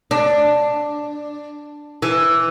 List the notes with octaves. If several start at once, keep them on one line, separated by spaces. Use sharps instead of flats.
D4
E3